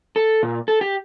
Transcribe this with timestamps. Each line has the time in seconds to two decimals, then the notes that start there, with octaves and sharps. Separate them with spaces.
0.16 A4
0.43 A#2
0.68 A4
0.81 G4